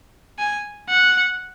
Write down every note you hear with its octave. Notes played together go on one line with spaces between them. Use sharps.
G#5
F#5